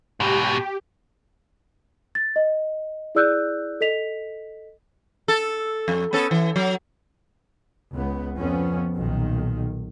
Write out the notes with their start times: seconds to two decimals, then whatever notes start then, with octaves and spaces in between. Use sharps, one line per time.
0.20 G#2 B2 G4
2.15 A6
2.36 D#5
3.15 E4 G#4 D5 E6 F#6 G6
3.81 A4 D#5 B6 F7
5.28 A4
5.88 F2
6.13 B3 C#4 A4
6.31 E3
6.56 F#3
7.92 C#2 B3
8.39 F2 F3 B3 C#4
8.96 B1 A#2 D#3